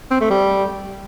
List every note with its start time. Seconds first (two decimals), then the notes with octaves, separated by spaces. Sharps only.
0.11 C4
0.21 A3
0.30 G3